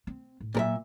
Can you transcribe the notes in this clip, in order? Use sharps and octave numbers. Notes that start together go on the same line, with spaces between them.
C4
A2
A#2 F#3 A#3 A#4 E5